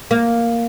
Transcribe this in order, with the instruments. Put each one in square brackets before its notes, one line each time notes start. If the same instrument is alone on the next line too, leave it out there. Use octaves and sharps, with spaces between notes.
[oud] A#3